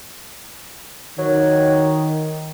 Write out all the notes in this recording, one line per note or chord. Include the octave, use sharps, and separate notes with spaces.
D#3 F#3